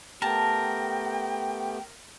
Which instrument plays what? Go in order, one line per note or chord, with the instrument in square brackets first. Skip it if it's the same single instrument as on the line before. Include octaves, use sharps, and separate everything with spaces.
[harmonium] A3 B3 G4 [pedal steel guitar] A#4 [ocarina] G5 [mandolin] A5 A#5